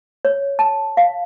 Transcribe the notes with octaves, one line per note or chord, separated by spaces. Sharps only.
C#5
A5
F5